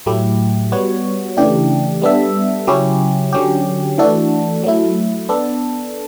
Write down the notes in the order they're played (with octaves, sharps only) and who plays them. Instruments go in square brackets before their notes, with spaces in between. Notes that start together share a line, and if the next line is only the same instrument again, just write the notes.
[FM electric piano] A2 F#3 A3 E4 G4
G3 B3 F#4 C#5
C#3 E3 A3 D4 G4
G3 B3 D4 A4 E5
C#3 F#3 C#4 E4 G4
D3 F#3 C#4 G4
E3 A3 D4 F#4 A4
F#3 A3 E4
B3 D4 A4